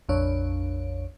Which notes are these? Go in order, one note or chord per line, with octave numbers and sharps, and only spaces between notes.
A#1 F2 D4 C#5